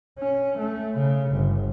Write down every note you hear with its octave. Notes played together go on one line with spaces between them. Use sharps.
C#4
A3
C#3
G1